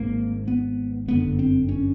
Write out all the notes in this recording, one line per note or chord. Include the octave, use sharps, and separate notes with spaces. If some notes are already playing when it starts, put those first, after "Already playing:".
Already playing: G#1 G#2 A#3
B3
G1 F#2 D3 B3
C4
C#4